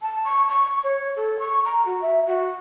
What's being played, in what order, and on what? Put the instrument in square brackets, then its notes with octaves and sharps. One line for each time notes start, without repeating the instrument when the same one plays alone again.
[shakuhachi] A5
C#6
C#6
C#5
A4
C#6
A#5
F#4
E5
F#4